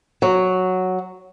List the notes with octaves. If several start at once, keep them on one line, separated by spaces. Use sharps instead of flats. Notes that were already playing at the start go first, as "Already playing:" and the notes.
F#3